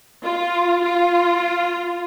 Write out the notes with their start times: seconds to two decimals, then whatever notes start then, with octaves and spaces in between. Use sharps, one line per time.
0.23 F4
0.82 F4